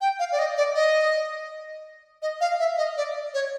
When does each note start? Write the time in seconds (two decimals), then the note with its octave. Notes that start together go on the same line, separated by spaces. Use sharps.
0.01 G5
0.19 F5
0.32 D5
0.39 D#5
0.57 D5
0.75 D#5
2.22 D#5
2.41 F5
2.59 E5
2.78 D#5
2.97 D5
3.34 C#5